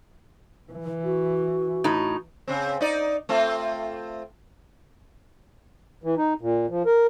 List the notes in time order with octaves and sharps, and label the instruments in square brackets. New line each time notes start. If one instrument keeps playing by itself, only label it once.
[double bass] E3
[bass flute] F#4
[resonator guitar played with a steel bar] A2 D#4
[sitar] C#3 C4
D#4 D5
A3 C4 F4
[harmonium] E3
D#4
A#2
F3
A#4